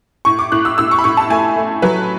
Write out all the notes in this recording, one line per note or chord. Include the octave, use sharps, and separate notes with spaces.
A2 C#6
D6
A2 F#6
E6
A2 E6
C#6
B5
A2 C#6
A5
A3 G#5
A3
F#3 B4